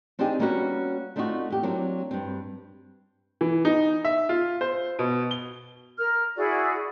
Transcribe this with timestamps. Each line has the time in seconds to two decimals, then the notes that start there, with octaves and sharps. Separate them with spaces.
0.19 C4 D4 D#4 G4 G#4
0.39 G3 A#3 B3 C#4 D#4 F#4
1.16 A3 C4 D4 D#4 F4 F#4
1.50 E2 G4
1.63 F#3 A#3 C4 D4
2.11 G2 C4
3.41 E3
3.65 D#4
4.05 E5
4.29 F4
4.61 C5
4.99 B2
5.31 G7
5.98 A#4 F6
6.37 E4 F#4 G#4 D5